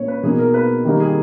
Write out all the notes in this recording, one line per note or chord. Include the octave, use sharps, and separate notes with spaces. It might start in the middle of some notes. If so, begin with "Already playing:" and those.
Already playing: A#2 A#3 C#4 C#5
B4
B2 A#3 D#4 G#4
A#4
B4
D#3 G3 A#3 D#4
G#4